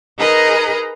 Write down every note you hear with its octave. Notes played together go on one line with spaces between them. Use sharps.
D#4 G#4 A#4 B4 D#5 A#5